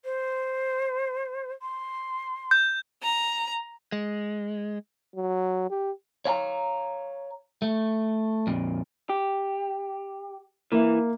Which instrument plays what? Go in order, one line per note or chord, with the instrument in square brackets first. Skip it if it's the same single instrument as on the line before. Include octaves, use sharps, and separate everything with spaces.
[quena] C5
C6
[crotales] G6
[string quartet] A#5
[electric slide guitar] G#3
[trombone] F#3
G4
[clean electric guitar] C#5 F5 G#5 A#5
A3
F2 A#2
G4
[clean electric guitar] E3 [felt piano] A#3 E5